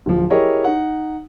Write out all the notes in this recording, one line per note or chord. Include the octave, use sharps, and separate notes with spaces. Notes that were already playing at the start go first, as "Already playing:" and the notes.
D1 F3
E4 G4 G#4 A#4 C#5 D#5
D#4 F#5